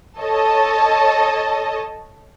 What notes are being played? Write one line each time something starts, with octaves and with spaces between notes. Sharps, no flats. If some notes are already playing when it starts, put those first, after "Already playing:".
A4 C#5 D#5 A5